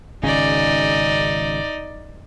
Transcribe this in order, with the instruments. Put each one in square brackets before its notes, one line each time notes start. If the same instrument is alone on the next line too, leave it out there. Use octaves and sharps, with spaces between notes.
[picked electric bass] G#1 C#3 C#4 [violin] D#4 D5